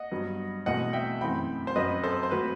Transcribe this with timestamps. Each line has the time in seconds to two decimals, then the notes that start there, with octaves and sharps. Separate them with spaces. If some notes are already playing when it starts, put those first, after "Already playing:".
Already playing: D#5 F#5
0.11 G2 F#3 B3
0.66 E2 B2 A3 C4 D#5 F#5
0.93 E5 G5
1.21 F#2 E3 A3 C4 G5 B5
1.67 C5
1.76 F#2 F#3 C4 B4 D#5
2.03 A4 C5
2.23 C5
2.31 F#3 A3 C4 B4